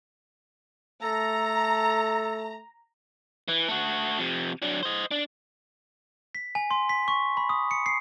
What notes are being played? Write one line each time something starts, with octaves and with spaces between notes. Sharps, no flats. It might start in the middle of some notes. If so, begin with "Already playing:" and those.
A3 A4 A#5
E3
A3 F#4
F2 C3
F#3 D4
C5 D#5
D4
B6
G#5
C6
B6
C#6
B5
D#6
C#7
C7